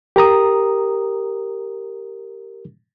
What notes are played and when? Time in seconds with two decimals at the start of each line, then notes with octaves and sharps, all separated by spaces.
0.16 G4 A#4 A#5 D#6